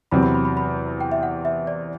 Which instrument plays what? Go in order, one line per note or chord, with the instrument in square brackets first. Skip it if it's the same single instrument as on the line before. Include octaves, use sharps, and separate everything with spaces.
[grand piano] E2 C3 F#3 C4 [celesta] B5
[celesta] B5
B5
B5
B5
G5
E5
F#5
E5
D5